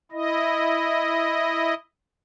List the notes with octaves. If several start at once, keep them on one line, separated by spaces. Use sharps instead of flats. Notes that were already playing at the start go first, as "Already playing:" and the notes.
E4 D#5